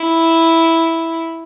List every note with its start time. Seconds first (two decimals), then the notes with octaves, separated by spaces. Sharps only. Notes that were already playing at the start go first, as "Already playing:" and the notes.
Already playing: E4